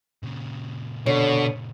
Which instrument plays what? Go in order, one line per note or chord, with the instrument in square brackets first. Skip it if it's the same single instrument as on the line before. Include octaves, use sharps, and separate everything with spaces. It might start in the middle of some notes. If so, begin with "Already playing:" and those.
[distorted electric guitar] A#2 C#3
[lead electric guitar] B2 [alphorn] D3 [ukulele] C#5